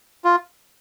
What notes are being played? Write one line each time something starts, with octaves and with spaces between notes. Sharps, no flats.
F4